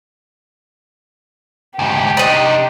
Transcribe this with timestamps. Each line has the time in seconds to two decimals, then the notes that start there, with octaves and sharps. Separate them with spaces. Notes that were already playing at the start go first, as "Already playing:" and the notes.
1.79 D2 G#2 G4
2.17 C3 D4 D#4 D#5